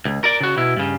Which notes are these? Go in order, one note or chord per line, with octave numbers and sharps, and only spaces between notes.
C#2
A#4 D5
C#3 F#4
B2 E4
G2 C#3